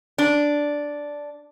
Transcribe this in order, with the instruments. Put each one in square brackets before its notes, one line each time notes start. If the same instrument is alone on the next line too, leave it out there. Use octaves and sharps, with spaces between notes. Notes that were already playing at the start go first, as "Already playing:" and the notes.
[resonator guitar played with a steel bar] D4